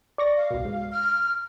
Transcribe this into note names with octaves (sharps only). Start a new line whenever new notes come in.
D5 C#6 A#6
F5
C2 B2
G#2
F6